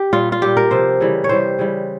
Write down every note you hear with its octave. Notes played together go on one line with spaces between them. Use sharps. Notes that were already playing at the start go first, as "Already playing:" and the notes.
Already playing: G4
A#2 G3 F4
F4
A#2 G3 G4
A#4
C3 F3 C5
C#3 E3 G3
C#5
C3 E3 G3 C5
C#3 E3 G3